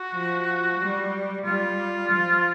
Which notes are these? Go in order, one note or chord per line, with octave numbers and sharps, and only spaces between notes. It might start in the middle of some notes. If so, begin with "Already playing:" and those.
Already playing: F#4
F3
G3
G3 F4
F3